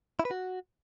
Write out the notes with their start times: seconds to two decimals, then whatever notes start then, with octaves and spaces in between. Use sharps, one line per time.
0.20 E4
0.25 B4
0.31 F#4